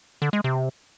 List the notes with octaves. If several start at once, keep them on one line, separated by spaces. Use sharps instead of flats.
D3
G#3
C3